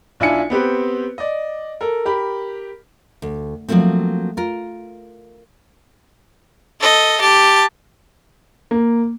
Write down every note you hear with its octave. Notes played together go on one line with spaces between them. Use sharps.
B1 D4 E4 F4 G#5 C#7
B3 C4 G4 B4
D5 D#5
A4 A#4
G4 A#4 B5
D2
F3 F#3 A3 A#3 C4
F4 A#4
A4 D#5
G4 A5
A#3